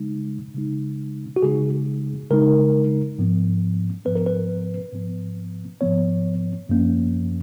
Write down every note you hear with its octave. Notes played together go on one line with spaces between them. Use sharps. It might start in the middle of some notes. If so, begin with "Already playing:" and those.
Already playing: C#3 G#3 D#4
C#3 G#3 D#4
F#4
C#3 G#3 D#4 G#4
C#3 G#3 D#4 A#4
G#2 F3 B3
G#2 F3 B3 B4
A#4
B4
G#2 F3 B3
G#2 F3 B3 C#5
F#2 F3 A#3 C#4